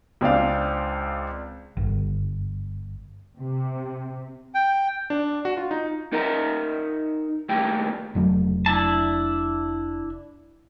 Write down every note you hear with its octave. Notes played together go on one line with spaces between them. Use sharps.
C#2 C4 D4 F5
G1
C3
G5
D4
F#4
F4
D#4
D#4 A#4 D#5 E5 F#5 A#5
D#2 G3 A3 E4 G5
F1 F#3 A3
D4 E4 A5